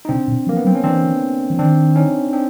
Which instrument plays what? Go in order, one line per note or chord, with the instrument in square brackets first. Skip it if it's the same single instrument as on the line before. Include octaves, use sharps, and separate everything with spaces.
[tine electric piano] D#4
[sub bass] C3 [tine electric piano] C4 D4
[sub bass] B2
[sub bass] F3 [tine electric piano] A#3
[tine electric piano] B3
[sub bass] F#3 [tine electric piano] C4
[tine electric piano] C#4
[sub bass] E3 [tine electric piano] C4 D4
[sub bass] E3
[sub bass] D#3 [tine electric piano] C4 D4
[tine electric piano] C#4 D#4
C4 D4